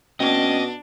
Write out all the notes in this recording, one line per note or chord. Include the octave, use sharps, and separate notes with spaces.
B2 C#4 D4 D#5 G5